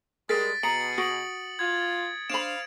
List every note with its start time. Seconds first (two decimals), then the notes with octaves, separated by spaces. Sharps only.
0.29 G3 G#3 G#4 A#4 A6 B6 D7
0.63 B2 G#4 A#5 C#7 D7 F#7
0.98 F#4 D#6 D7 F#7
1.59 F4 G#6
2.30 D4 C5 F5 B5 D7 E7